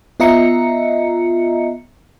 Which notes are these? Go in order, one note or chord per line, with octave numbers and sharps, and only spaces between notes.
B3 F4 D#5 E5 A#5 C#7